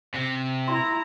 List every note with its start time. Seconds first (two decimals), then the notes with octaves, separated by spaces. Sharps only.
0.14 C3
0.68 E4 A#5 C6